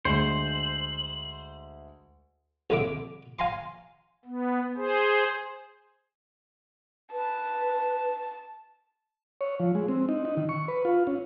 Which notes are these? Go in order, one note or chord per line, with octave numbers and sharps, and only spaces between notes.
D2 G#3 C5 F#7
C2 D3 E4 E5 D6
F5 G#5 A#5 C6 C#6
B3
G#4 C5
B4 A5
C#5
F3
G#3
C4
D#4
D#4
D#3
C#6
B4
F4
C#4